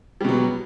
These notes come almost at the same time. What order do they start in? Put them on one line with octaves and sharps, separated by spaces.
G3 B2 F#3